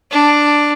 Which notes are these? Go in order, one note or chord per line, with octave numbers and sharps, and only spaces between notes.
D4